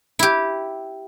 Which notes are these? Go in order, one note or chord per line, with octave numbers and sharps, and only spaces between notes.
E4 G4